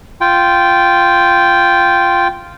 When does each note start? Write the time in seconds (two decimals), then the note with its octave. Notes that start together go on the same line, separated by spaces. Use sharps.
0.21 F4 G5